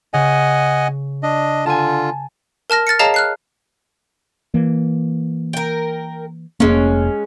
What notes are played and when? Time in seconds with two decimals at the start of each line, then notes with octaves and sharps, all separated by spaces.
0.14 C#3 D#5 F#5 G#5
1.23 D4 D#5
1.66 D3 F4 G#5 A5
2.70 A#4 A5 F6 A#6
2.87 F6 A6 A#6 C#7
2.99 G#4 C#5 D#5 F5 A5 A#5
3.14 F6 F#6 C7
4.54 E3 A#3
5.53 A#4 G5
6.60 F1 G#3 A#3 C#4